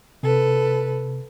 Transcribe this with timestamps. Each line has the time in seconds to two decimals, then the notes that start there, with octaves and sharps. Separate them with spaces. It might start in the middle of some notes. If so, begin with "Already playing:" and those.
0.23 C3 A4 B4